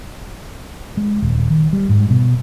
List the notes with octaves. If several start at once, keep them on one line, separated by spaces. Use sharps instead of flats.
G#3
D#1
D#3
G3
G#2
B2